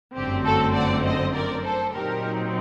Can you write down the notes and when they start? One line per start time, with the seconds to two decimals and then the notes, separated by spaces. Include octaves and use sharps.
0.16 G1 F#2 D3 A3 C4 G4
0.45 F#4 A4
0.75 D5 F#5
1.05 C5 D#5
1.34 A#4 D5
1.64 A4 C5
1.94 A#2 F#3 C4 D#4 G4 A#4